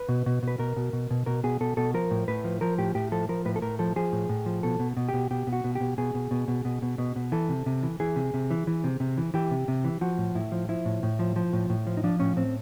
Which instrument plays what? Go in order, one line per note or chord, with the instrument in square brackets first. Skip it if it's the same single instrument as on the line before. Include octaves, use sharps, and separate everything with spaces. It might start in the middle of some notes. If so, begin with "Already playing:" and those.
Already playing: [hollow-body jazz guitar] B4
B2
B2
B2 B4
B2 A#4
B2
B2
B2
B2 A#4
B2 G#4
B2 A4
B2 A4
F3 A#4
A2
A2 B4
F3
F3 A#4
A2 G4
A2 G4
F3 A4
F3 A#4
A2 B4
A4
A2 A#4
F3 A4
F3 G#4
A2
A2
F3
B2 A4
B2
B2
G4
B2
B2 G4
B2
F#4
B2
G4
B2
B2 G#4
B2
B2
B2
B2
B2
B2
B2
E3 A4
C3
C3
E3
E3 G#4
C3
C3
E3
E3
C3
C3
E3
E3 G4
C3
C3
E3
F3 F#4
A2
A2 E4
F3
F3 E4
A2
A2
F3
F3
A2
A2
F3
D#4
F3 D4
A2 C#4
A2 C4